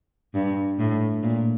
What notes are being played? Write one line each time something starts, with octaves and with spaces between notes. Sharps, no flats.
G2
A2
A#2